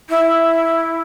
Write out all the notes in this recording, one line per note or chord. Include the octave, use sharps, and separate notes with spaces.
E4